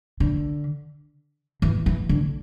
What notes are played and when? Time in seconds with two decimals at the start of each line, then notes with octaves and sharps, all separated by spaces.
0.20 D3
1.62 E3
1.86 E3
2.09 D3